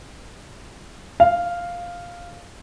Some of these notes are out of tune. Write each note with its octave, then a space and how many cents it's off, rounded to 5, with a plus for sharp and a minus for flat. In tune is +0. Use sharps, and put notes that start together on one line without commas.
F5 +0